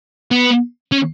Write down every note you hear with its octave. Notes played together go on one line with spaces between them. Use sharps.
B3
C#4